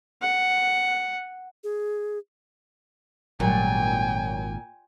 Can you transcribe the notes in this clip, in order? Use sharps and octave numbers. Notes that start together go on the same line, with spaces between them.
F#5
G#4
G#1 A#2 F#3 G3 A3 G5 G#5